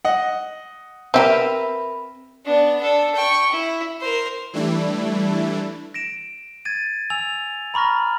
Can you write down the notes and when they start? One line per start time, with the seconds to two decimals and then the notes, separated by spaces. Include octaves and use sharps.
0.05 D#5 F#5
1.14 C4 G4 A#4 B4 E5
2.46 B3 D4
2.80 D4 A4
3.15 G5 C#6
3.52 E4
4.01 A#4 C5
4.54 E3 G3 A3 D4 E4
5.94 A#6 D7 E7
6.65 G#6 A6 D#7
7.10 G#5 E6 F7
7.74 A#5 B5 C#6 F6 A#6